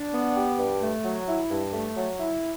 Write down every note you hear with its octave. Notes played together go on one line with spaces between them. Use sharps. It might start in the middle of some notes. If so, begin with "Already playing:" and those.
Already playing: D4
B3
G4
G2
A3
F#3
E4
G2
A3
F#3
E4